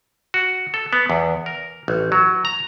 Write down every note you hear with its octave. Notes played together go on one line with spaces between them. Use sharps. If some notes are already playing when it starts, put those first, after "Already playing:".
F#4
A4
B3
E2
A#4
A1
F#3
A#5